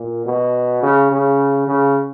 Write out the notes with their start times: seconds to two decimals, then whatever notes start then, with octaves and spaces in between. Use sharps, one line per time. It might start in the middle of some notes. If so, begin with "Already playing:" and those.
Already playing: A#2
0.26 B2
0.83 C#3
1.12 C#3
1.67 C#3